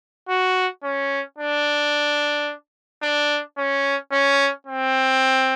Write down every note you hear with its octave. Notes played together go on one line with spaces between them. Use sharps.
F#4
C#4
D4
D4
C#4
C#4
C4